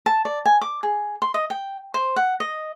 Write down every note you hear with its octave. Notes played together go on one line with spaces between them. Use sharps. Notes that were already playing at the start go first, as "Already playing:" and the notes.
A5
D5
G#5
D6
G#4
C6
D#5
G5
C5
F#5
D#5